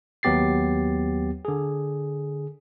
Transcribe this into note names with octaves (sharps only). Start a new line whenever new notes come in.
D#2 F#3 B3 G4 A6 C7
D3 G#4